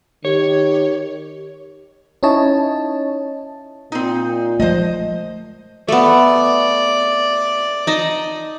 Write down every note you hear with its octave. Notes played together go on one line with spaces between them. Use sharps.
D#3 G4 C#5
C#4 D#4 E4 C#5 D#5 A5
A#2 C4 D#4
F3 G#3 A3 C5 D#5
A3 B3 D5
D#4 D#5 A5